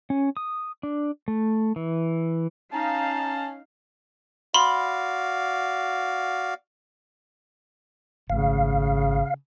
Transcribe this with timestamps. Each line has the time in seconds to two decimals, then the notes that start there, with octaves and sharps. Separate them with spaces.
0.10 C#4
0.37 D#6
0.83 D4
1.28 A3
1.76 E3
2.73 C#4 D#4 F5 A5 A#5
4.54 F#4 D5 F5 B5 C6
8.30 G#1 C#3 A3 F5